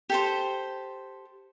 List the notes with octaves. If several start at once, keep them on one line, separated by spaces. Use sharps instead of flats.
G4 A4 C5